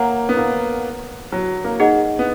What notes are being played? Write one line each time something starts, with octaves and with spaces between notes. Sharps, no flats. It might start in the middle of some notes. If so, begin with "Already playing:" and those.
Already playing: A#3 C#5 F#5 A#5
B3
A#3
F#3
A#3
D#4 G#4 D#5 F#5
B3